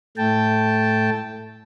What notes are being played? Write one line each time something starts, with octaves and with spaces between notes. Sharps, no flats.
A2 A3 G5 A5